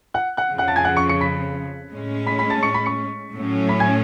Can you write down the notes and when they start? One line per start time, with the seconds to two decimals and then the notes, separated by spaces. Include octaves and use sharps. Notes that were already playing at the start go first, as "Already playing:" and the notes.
0.14 F#5 F#6
0.37 F#5 F#6
0.50 F2 C#3 F3
0.58 F#5 F#6
0.68 A5 A6
0.76 G#5 G#6
0.85 F#5 F#6
0.97 C#6 C#7
1.09 C#6 C#7
1.21 B5 B6
1.91 A2 G#3 C#4
2.26 B5 B6
2.39 B5 B6
2.50 A5 A6
2.63 C#6 C#7
2.74 B5 B6
2.86 C#6 C#7
3.34 A2 F#3 A3 C#4
3.69 B5 B6
3.80 G#5 G#6